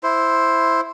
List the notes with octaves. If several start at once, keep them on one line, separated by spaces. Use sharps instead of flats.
E4 C5